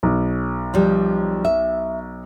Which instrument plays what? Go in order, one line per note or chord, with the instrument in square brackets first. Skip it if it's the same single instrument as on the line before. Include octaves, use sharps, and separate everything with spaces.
[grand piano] B1
[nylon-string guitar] F3 G3
E5